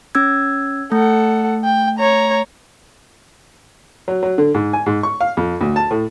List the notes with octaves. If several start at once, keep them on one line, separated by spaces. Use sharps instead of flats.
C#4 E6 G#6
A3 A4 F#5
G5
C#5 A#5
F#3
F#3
D3
G#2
G#5
G#2
C#6
F5
F2
D2
A5
A2